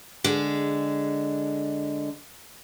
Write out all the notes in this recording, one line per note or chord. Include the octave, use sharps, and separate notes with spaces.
D3 G#3